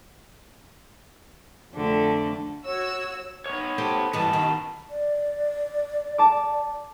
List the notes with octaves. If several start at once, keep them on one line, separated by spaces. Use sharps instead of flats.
F2 D3 A3
F#4 C#5 E6
B3 C#5
G4 A4 C5
G2 E3 B3 D#5 A5
D#3
D5
A5 D6